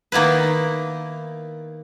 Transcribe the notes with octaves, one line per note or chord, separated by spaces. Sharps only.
D#3 A#3 B3 E4 B4